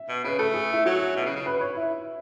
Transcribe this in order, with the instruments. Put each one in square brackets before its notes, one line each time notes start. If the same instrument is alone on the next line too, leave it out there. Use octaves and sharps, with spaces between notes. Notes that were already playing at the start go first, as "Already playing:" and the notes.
Already playing: [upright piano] E5
[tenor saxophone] B2
[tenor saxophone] C#3 [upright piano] B4
[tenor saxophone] A3 [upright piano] A4
[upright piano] G#4
E4
[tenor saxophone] F#3 [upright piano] F#4
[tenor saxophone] B2 [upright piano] E4
[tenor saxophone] C#3
C#3
[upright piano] B4
C#5
E4